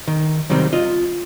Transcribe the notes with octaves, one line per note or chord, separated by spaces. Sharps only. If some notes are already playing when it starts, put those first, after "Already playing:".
D#3
C2 D#3 F#3 G3 C4
F4 D#5